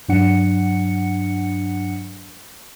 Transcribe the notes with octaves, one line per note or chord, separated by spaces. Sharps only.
G2 F#3 D4 F#5 C#7